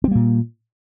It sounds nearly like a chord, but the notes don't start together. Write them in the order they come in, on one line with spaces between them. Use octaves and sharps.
C4 G3 A#3 A#2